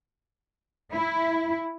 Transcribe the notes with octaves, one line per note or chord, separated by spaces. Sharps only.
E4